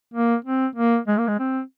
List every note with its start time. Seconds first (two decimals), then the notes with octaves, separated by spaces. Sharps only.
0.14 A#3
0.45 C4
0.76 A#3
1.08 G#3
1.18 A#3
1.28 G#3
1.39 C4